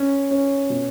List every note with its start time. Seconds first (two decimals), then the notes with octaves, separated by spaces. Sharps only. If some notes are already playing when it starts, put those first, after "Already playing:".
Already playing: C#4
0.31 C#4
0.70 B2